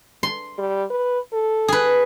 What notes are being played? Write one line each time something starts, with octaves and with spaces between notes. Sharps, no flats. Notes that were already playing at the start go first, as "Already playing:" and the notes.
C6
G3
B4
A4
G#4 B4